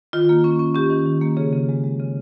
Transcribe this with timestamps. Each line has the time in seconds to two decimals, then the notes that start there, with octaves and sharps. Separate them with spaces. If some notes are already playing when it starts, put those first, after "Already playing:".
0.13 D#3 F4
0.29 A#3
0.44 C#4
0.59 C#4
0.75 C#4 G4
0.90 D#3
1.06 D#3
1.22 A#3
1.37 C#3 G#4
1.52 C#3
1.69 G#3
1.84 G#3
2.00 C#3